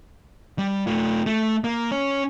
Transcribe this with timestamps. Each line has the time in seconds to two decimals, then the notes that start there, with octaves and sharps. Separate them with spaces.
0.59 G3
0.87 A3 F4
1.26 A3
1.64 A#3
1.91 C#4 C#5